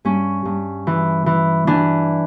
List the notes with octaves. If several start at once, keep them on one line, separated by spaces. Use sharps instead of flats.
G2 C#4
G2
E3
E3
E3 D4